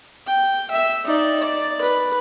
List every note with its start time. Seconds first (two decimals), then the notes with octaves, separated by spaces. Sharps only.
0.27 G5
0.71 E5
1.05 D#4 D5
1.39 D5
1.81 B4